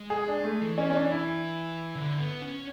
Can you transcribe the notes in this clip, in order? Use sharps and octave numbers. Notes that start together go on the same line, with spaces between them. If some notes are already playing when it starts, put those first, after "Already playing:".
Already playing: G#3
G#4
D4
A3
E3
C#4
C#4
D4
E4
D3
B3
C#4